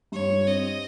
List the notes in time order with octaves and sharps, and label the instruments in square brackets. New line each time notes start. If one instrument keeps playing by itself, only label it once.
[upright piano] G2 [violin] C#5
[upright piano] G3
[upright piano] C4 [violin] D#5